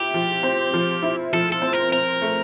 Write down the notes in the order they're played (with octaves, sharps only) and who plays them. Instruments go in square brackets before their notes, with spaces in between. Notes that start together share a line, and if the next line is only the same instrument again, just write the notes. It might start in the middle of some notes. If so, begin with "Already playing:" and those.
Already playing: [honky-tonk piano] F3 E4 [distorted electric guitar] G4
[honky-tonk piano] F3
C4
F3
E4
[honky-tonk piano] F3 [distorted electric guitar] A4
[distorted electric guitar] A4
[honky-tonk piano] C4
[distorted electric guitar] A#4
[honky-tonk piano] C4 [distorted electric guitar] A#4
[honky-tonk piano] A3